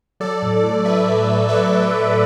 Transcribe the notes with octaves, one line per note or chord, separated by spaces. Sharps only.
F#3 A4 D5
A2
A2
A2 B4 E5
F#3
A2
F#3 B4 E5
A2
F#3